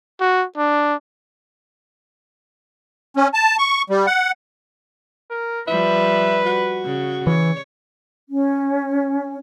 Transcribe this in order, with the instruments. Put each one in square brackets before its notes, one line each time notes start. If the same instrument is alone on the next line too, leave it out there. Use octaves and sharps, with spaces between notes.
[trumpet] F#4
D4
[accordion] C#4
A5
C#6
G3
F#5
[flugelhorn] A#4
[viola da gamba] F3 G3 [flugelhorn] B4 [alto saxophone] E5
[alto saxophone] F#4
[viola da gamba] C#3
[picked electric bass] E3 [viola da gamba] C#5
[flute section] C#4